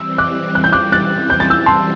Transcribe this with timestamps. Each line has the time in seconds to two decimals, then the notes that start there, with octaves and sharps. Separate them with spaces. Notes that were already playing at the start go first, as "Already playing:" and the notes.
Already playing: E3 G3 C4 E6
0.18 D6 F#6
0.55 F#6
0.64 G6
0.72 D6 F#6
0.92 F#6 A6
1.30 G6
1.40 A6
1.50 E6 G6
1.66 A5 C6